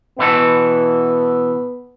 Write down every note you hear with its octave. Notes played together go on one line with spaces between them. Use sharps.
B2 E3 B3 A4